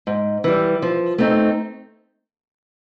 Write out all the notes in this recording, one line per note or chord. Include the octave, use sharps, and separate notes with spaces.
G#2
E3 G3
F3
A3 C4 D#4